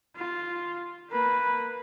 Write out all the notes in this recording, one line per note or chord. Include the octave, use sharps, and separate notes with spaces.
F4
A#3 B4